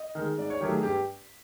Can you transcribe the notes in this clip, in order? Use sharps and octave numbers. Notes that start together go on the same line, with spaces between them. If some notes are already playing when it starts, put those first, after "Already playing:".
Already playing: D#5
D#3 G#3
G#2 D5
C#5
D#3 F#3 A3 G4
G#4
G2 G4